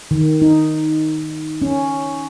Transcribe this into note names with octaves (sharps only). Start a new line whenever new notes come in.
D#3
D#4
C#4